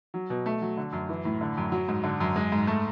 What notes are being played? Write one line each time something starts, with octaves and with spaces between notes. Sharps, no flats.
F#3
B2
A3
F#3
D3
F#2
E3
A2
D3
F#2
F#3
G#2
D3
F#2
G#3
G#2
A3